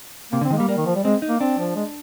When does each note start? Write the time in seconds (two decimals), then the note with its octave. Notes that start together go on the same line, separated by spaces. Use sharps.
0.32 C3 A#3
0.41 D3
0.44 C4
0.50 D#3 G#3
0.57 G3 A#3
0.68 G3 A#3
0.77 D#3
0.86 F3
0.95 G3
1.04 G#3 C4
1.22 D#4
1.29 A#3
1.40 C4 D4
1.59 F3
1.75 G#3